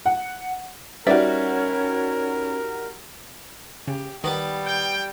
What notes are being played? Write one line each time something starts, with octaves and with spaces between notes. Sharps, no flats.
F#5
G3 C#4 D#4 F#4 A#4 D5 E5
C#3 G4
D#3 G3 B3 B4 D6
G5